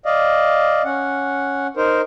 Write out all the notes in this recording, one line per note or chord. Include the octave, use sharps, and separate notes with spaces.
D5 D#5 F5
C#4 F#5
D#4 A#4 C5